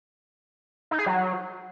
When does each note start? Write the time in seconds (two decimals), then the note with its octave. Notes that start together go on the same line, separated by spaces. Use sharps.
0.91 D#4
0.99 G#4
1.06 F#3